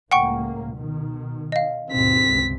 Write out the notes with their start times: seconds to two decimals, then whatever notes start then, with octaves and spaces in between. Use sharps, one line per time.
0.11 C#2 A2 A#3 F#5 G5 C#6
0.74 B2 D#3
1.52 D#5 F5
1.91 D#2 G#2 B2 C4 B6
2.27 G1 C#2 C3